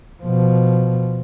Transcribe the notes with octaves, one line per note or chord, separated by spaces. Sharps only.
B2 F3